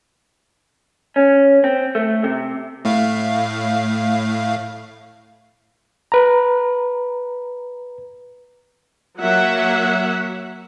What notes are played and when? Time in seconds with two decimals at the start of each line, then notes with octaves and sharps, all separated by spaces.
1.16 C#4
1.64 C4
1.95 A3
2.24 C3
2.85 A2 A3 F5
6.12 B4 A#5
9.20 F#3 A#3 E5 F#5